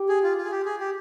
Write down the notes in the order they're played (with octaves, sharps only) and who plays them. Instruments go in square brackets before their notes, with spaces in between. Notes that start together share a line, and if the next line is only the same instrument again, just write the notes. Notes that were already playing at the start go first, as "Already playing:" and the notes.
Already playing: [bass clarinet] G4
[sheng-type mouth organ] G#4
F4
F4
G#4
G4
G#4
G4